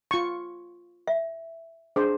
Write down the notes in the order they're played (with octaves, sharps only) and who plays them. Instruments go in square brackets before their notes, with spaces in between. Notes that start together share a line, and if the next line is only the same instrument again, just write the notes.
[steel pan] F4 C#6
[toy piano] E5
[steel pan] D4 C5 [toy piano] G#4